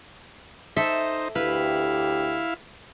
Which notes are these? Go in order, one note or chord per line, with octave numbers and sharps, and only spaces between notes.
D#4 A4 C5 E5
D2 E4 G4 B4 F5